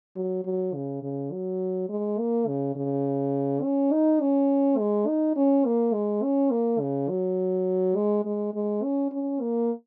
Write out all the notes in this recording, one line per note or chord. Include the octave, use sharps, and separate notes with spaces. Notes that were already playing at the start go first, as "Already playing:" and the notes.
F#3
F#3
C#3
C#3
F#3
G#3
A#3
C#3
C#3
C#4
D#4
C#4
G#3
D#4
C#4
A#3
G#3
C#4
A#3
C#3
F#3
G#3
G#3
G#3
C#4
C#4
A#3